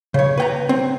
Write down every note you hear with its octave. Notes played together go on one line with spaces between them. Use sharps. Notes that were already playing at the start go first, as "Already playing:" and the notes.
C#3 C#5
B4 G5 A#5
C4